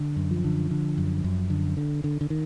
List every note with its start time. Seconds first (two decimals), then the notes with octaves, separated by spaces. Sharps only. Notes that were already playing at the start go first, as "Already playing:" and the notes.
Already playing: D3
0.16 F#2
0.31 F3
0.44 D3
0.71 D3
0.98 F#2
1.24 F#2
1.50 D3
1.77 D3
2.04 D3
2.21 D3
2.30 D#3